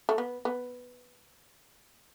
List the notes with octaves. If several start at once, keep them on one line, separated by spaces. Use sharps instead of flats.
A3
B3
B3